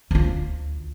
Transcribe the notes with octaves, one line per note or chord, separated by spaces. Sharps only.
D2 F4